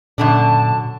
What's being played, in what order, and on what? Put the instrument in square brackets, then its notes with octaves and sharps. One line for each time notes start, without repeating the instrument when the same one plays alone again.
[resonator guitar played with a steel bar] F#2 D3 D4 [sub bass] A#2 [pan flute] A5